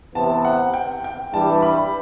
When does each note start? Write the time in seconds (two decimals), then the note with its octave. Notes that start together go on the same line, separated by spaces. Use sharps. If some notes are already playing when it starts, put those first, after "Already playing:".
0.15 C3 E3 B3 A5
0.45 F#5
0.74 G5
1.04 G5
1.33 G2 E3 G3 A5
1.62 B5